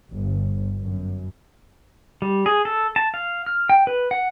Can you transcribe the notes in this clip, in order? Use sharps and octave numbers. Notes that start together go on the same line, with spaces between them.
G1
F#2
G3
G#4
A4
A5
F5
F6
G5
B4
F#5